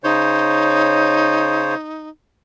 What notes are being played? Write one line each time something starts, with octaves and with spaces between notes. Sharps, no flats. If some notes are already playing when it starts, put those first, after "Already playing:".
C#3 D#4 C5 C#5